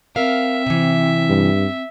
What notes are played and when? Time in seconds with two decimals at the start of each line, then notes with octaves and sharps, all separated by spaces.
0.16 C4 A#4 E5 F5
0.66 C3 E3
1.30 G2